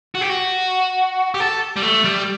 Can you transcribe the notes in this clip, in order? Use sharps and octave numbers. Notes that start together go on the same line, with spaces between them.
F#4
G4
F#4
G4
A4
G3
A3
G3